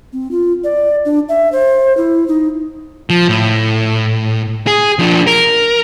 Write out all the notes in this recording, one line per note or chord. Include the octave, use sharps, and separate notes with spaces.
C4
F4
D5
D4
E5
C5
E4
D#4
F3
A2
G#4
F3 D4
A#4